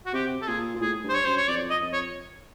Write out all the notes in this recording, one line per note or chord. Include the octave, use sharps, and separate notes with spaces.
F#4
C3 G4
A4
A#2 G#4
A#2
A2 G#4
G2
C5
C#5
F#2 C5
C#5
F2 D5
D#5
F2
C#5